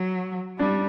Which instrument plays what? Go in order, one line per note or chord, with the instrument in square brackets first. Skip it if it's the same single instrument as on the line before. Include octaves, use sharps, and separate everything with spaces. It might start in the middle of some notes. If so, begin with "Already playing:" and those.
Already playing: [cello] F#3
[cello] G3 [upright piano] D4